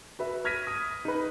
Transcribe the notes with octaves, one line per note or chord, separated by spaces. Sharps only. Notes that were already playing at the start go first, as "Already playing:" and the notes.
F#4 B4 E5
F6 G#6 A#6 B6 D#7
D#6 D#7
D#4 B4